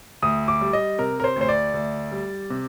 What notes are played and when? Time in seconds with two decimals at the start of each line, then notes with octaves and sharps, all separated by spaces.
0.22 D2 D#6
0.48 D6
0.61 G3
0.73 D#5
0.98 C3 A#4
1.20 A#4
1.24 C5
1.36 D2 C5
1.49 D5
1.74 D2
2.12 G3
2.50 C3